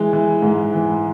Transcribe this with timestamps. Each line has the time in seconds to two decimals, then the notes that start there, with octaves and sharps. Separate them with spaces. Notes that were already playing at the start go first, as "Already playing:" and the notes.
Already playing: E3 G#3
0.13 E3
0.42 G#2
0.74 E3